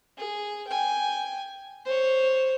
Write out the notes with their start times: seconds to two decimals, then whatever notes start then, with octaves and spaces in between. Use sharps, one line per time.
0.18 G#4
0.67 G5 G#5
1.86 C5 C#5